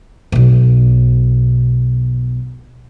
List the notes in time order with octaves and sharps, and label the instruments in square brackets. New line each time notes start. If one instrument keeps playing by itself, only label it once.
[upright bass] B1 B2